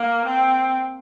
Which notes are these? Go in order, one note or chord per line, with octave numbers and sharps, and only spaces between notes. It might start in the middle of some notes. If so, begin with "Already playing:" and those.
Already playing: A#3
C4